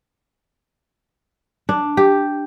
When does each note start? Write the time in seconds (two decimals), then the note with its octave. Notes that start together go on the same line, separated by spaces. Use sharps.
1.69 D4
1.97 G4